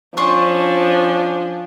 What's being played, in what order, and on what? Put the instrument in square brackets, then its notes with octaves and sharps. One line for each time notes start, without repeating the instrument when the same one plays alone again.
[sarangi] F3 [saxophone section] C#4 D4 [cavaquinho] C5 C#6